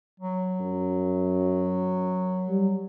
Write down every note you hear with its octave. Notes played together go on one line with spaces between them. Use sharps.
F#3
F#2
G3